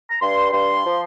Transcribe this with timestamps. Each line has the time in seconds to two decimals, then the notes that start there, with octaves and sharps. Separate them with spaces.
0.09 A#5
0.20 G2 C6
0.52 G2 C6
0.84 F3